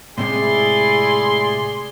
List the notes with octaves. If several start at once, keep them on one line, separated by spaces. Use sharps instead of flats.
A2 C3 G#3 E4 G#4 D5 C6